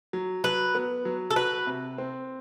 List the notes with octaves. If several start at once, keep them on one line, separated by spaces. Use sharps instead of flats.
F#3
F#3 B4
B3
F#3
A4
F#4 B4
C3
C4